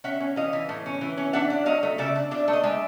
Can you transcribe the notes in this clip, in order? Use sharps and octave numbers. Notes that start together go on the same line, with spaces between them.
C#4 E5 F#5
C#4
E3 D#5 F5
E3
A2
C#4
E3
C#4
D4 E5 F#5
D4
F#3 D#5 F5
A3
C#3 D5 E5
D4
D4 D5 E5
A3
D#5
G#3 D5 E5